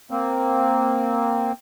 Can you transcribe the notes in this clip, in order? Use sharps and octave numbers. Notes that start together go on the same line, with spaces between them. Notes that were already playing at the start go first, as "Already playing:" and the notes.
A#3 C4